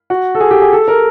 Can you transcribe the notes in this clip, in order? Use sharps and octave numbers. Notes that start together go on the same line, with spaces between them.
F#4
A4
G#4
G4
G#4
A4
A#4